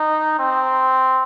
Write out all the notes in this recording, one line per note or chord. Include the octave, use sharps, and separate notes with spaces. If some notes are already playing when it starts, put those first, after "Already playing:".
Already playing: D#4
C4